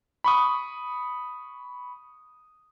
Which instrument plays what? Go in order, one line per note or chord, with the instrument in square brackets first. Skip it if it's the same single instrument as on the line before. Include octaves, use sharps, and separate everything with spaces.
[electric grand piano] B5 C#6 D#6